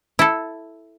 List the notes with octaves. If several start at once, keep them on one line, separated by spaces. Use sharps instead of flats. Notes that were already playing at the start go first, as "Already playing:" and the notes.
E4 A4